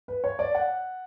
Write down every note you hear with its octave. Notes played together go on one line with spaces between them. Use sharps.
B4
C#5
D5
F#5